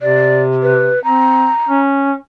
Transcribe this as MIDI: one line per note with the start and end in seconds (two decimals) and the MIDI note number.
0.01 0.93 48
0.01 0.42 74
0.62 1.02 71
1.04 1.49 60
1.04 1.79 82
1.69 2.14 61